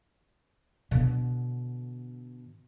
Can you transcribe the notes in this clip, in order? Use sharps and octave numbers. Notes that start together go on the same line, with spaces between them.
B2 D3